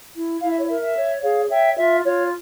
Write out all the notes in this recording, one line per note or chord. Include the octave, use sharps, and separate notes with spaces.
E4
E4 F5
E5
C#5
A#4 E5
E5
C#5
G#4 C#5 F5
C#5 E5 G5
F4 E5
F4 C#5